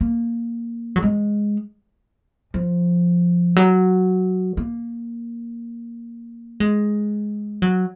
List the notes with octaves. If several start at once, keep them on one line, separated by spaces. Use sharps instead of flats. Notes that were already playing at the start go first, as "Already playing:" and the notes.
A#3
F#3
G#3
F3
F#3
A#3
G#3
F#3